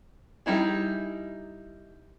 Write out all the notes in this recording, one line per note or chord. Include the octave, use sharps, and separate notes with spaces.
G3 D#4 E4 G#4